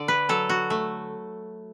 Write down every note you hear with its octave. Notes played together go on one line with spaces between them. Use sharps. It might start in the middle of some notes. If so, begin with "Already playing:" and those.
Already playing: D3 D5
B4
F#3 A4
F#4
A3